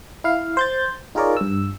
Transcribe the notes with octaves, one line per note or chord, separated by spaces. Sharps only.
E4 F5
C5 G6 A6
D#4 F4 G#4 A#4 C#5 D5
G2 E6